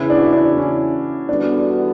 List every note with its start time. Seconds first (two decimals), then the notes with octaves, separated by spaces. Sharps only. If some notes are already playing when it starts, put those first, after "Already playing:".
Already playing: E2 C#3 E3 E4
0.10 D4
0.17 F#4
0.25 E4
0.33 D4
0.57 C#4
1.28 E2 D3 G3 B3 D4 F#4